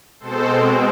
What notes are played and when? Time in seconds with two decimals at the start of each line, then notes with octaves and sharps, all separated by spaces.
0.20 B2 G#3 C4 A4 C5